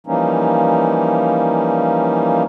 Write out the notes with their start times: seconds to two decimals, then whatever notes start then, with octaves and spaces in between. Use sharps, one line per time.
0.07 E3 F3 G3 A#3 C#4 D#4